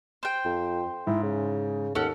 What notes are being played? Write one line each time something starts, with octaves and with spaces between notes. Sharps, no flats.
C5 G5
F2
G#2 E4
C#3
D#2 C#4 A4 F#5